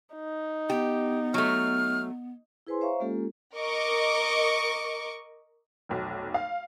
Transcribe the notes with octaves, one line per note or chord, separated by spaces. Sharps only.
D#4
B3 G4
F#3 A3 F6
E4 G#4 B4 C5 G#5 C6
C5 C#5 E5 F5 A#5 C#6
G#3 A#3 C#4 F4 G4 A4
A#4 D#5 C#6 D6
F1 B1
F5